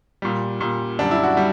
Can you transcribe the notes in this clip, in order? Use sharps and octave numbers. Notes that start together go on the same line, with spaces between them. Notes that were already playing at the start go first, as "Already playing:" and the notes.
A#2 G3
A#2 G3
F#2 D3 G3 D4
E4
F#4
G3